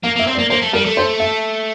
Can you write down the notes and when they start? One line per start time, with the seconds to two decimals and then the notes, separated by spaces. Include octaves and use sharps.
0.04 A#3 F5
0.16 A#3 E5
0.27 C4
0.35 D5
0.38 A#3
0.50 A#3 C5
0.61 A3
0.73 G3 A#4
0.85 A3
0.97 C5
1.20 E5